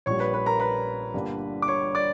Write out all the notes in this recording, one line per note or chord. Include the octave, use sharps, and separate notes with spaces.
A#1 A#2 G3 C#5 C#6
B4 B5
B4 B5
A#4 A#5
B4 B5
G1 G2 D3 G3 A#3
D6
C#5 C#6
D5 D6